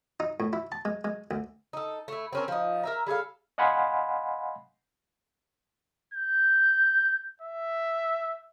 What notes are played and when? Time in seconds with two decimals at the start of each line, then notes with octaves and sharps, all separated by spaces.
0.20 D#4
0.40 A2
0.53 E4
0.72 A5
0.85 G#3
1.04 G#3
1.31 D2
1.73 D#4 A4
2.08 A3 E4
2.33 C4 C#4 A#4
2.48 F3 D#4
2.83 A#4 E5 A#5
3.06 G3 G#4 A4 F5
3.58 D#5 F5 F#5 G#5 B5 C6
6.14 G6
7.42 E5